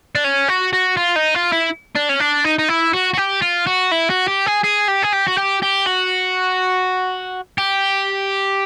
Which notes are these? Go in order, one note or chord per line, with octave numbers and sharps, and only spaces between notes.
D4
C#4
F#4
F#4
F4
D#4
F4
E4
D4
C#4
D4
D#4
D#4
E4
F#4
F#4
G4
F4
F#4
E4
F#4
G4
G#4
G#4
G4
G#4
G4
F#4
G4
G4
F#4
G4